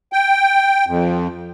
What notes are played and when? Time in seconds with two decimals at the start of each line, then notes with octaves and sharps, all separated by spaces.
0.13 G5
0.87 F2